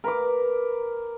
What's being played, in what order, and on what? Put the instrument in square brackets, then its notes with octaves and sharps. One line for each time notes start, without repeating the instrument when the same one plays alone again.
[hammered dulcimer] A#4 B4 D6